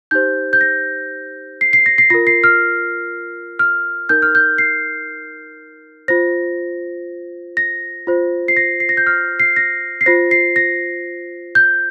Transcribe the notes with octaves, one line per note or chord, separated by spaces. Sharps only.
D#4 G4 C5 G6
G6
A#6
C7
C7
A#6
C7
F4 A#4 A#6
C7
F6
F6
D#4 A#4 G6
F6
G6
C7
F4 C5 A#6
A#6
F4 C5
C7
A#6
C7
A#6
G6
F6
C7
A#6
C7
F4 C5 A#6
C7
A#6
G6